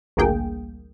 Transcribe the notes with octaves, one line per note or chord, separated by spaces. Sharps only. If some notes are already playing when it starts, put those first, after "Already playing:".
A1 D2 G2 A#3 G#4 G5